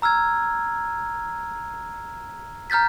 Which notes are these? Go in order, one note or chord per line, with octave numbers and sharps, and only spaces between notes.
A#5 E6 F6 G#6
A#5 F6 G6 A6 B6